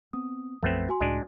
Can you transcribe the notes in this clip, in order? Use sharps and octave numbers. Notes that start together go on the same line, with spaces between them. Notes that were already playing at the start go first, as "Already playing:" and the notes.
B3 C4 D#6
B1 F#2 F3 A3 B3 C4
F#4 G#5 C6
C#2 A2 G#3 D4